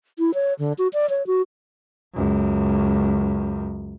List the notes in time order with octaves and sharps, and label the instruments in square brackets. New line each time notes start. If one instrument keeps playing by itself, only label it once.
[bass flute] E4
C#5
D3
F#4
D5
C#5
F#4
[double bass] C#2 F#2